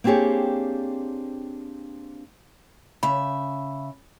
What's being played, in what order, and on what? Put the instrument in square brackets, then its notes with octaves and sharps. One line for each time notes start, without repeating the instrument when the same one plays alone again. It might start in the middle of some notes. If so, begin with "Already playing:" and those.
[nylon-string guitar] A#3 C4 D4 G4 G#4 C#5
[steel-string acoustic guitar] C#3 E5 [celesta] B5